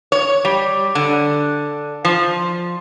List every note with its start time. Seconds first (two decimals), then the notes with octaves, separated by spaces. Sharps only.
0.12 C#5
0.45 G3
0.95 D3
2.05 F3